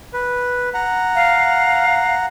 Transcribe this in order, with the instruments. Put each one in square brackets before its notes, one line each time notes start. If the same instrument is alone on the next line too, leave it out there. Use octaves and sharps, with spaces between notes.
[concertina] B4
F#5 A#5
[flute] F5